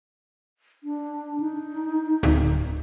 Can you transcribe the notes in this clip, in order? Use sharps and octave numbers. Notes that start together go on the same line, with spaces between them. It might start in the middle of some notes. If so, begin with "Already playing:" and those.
D4
D#4
D1